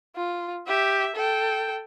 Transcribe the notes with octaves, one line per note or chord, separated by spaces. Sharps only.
F4
G4 E5
A4 G5